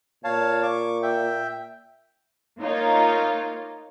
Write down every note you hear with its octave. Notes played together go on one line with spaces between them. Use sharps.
A#2 C#5 F5 A5
C#6 D6
E5 G5
A#3 D#4 F4 C#5